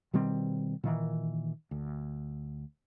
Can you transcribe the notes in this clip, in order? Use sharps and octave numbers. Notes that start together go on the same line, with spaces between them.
B2 D#3 G3 C4
A#2 D#3 E3
D2